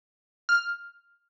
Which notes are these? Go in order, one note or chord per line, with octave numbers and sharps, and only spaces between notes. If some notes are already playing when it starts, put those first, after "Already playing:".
F6